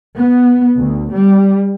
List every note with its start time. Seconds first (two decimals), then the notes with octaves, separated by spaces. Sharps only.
0.16 B3
0.76 D2
1.13 G3